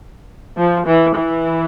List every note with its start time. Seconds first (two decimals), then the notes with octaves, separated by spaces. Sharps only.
0.57 F3
0.86 E3
1.15 E3